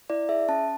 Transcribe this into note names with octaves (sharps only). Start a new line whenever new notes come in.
E4 D5
G#4 E5
C#4 A5